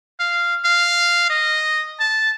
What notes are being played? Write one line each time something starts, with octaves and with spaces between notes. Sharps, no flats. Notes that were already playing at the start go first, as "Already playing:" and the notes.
F5
F5
D#5
A5